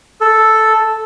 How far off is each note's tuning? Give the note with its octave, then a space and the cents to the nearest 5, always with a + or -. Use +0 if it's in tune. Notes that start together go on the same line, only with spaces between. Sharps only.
A4 +0